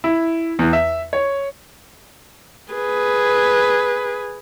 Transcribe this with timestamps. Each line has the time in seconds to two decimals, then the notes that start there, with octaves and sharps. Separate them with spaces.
0.04 E4
0.59 E2
0.73 E5
1.13 C#5
2.73 G#4 B4